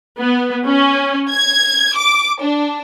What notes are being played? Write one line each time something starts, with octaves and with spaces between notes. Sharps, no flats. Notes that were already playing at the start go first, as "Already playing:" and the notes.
B3
C#4
G#6
D6
D4